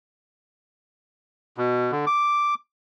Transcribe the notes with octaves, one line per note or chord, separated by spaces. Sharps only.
B2
D3
D6